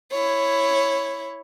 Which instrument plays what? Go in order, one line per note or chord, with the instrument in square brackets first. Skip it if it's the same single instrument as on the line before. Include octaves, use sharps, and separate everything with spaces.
[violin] E4 C#5